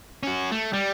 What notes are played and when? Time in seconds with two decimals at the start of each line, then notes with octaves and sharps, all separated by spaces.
0.23 C#4 F#4
0.52 A3
0.73 G3